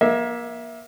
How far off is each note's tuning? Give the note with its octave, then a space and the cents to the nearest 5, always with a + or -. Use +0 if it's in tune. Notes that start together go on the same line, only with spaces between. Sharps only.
A#3 +30 E5 +0